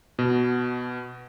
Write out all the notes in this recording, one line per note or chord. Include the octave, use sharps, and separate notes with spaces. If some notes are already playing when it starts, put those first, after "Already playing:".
B2